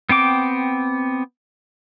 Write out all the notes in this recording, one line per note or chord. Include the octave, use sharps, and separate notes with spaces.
B3 C4 G5 D6